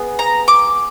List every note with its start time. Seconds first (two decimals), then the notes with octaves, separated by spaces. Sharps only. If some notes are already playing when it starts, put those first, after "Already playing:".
Already playing: B3 G#4
0.19 A#5
0.48 D6